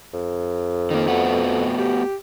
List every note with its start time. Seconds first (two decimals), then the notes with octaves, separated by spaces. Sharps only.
0.14 F2
0.90 D#3 A#3
1.08 A3 B3 F#4
1.79 G4